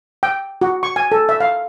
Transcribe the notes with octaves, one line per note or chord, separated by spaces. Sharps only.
G5
F#4
C#6
G#5
A4
E5
F5